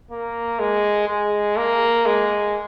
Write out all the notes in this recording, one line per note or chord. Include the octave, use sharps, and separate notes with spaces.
A#3
G#3
G#3
A#3
G#3